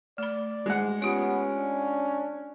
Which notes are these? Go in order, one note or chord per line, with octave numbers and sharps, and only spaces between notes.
A3 D5 B5
G#2 G#3 F#5
B3 C#4 F4 G4
D4